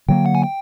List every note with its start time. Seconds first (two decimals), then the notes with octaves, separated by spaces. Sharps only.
0.08 D3 F#3 A#3 G5
0.26 F#5
0.35 G#5
0.43 G5